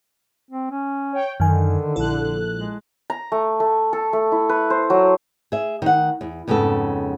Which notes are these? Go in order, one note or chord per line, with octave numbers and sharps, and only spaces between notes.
C4
C#4
C#5 G5
F#2 D3 D#3 G#5
A#1 E4 A4 F#6
G#3
A#5
A3
A3
A4
A3
E4
B4
C5
F#3
G#4 E5
D#3 F#5
E2
F2 G#2 C#3 B3 A4